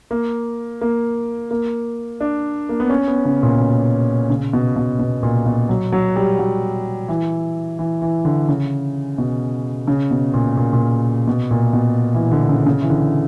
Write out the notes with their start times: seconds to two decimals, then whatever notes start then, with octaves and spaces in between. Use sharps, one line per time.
0.11 A#3
0.81 A#3
1.51 A#3
2.21 D4
2.69 A#3
2.80 B3
2.90 C#4
3.08 B3
3.25 C#3
3.43 A#2
3.60 B2
4.30 C#3
4.53 B2
4.76 B2
4.99 B2
5.23 A#2
5.46 B2
5.69 F#3
5.92 F#3
6.16 G3
6.39 F#3
7.09 E3
7.79 E3
8.02 E3
8.25 D3
8.48 C#3
9.18 B2
9.88 C#3
10.11 B2
10.34 A#2
10.57 A#2
10.73 A#2
11.27 B2
11.51 A#2
11.73 B2
12.15 E3
12.31 D3
12.49 C#3
12.66 C#3
12.82 E3
12.90 D3